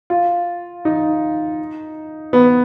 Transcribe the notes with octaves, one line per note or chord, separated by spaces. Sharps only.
F4
D#4
B3